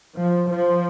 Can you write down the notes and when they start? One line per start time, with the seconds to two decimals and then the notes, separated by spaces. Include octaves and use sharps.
0.15 F3
0.49 F3